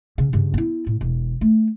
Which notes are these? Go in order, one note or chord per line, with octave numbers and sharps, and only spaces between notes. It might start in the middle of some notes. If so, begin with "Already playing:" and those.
C#3
G2 C#3
B3 E4
A2
E1
A3